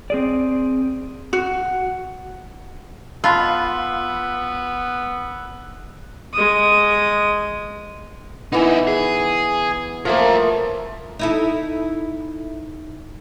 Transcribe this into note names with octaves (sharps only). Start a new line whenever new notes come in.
C4 G#4 D5
F#4
B3 F4 A5 B5 C6 E6 F#6
G#3 D#6
E3 B3 D#4 E4
G#4
F3 A3 A#3 A#4 E5
D#4 E4 A4